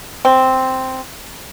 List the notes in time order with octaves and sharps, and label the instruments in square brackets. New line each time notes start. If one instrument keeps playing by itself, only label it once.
[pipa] C4